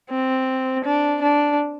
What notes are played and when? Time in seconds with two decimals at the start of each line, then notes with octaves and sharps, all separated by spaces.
0.11 C4
0.84 D4
1.22 D4